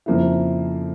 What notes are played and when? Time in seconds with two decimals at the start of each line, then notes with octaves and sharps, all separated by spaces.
0.06 F2 C#3 F3 A#3 E4